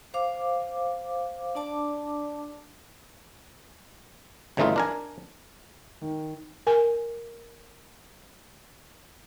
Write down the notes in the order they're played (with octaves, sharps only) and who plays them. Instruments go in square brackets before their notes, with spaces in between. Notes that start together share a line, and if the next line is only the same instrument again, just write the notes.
[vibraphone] C5 F5 D6
D4 D5 A5 D6
[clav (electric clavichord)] G1 C#3 E3 A3 D#4 F4
D4 A#4 G#5
[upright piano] D#3
[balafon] A#4 G#5